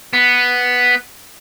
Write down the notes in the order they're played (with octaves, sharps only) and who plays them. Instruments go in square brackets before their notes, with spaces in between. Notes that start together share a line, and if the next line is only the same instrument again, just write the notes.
[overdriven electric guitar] B3